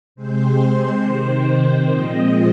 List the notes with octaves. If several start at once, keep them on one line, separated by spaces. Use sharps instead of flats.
C3 G#3 C4 C5
C3 D#3 C4
A#2 F3 G#3 C4 D#5